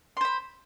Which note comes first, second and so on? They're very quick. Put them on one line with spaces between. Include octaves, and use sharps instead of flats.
C6 C5 B5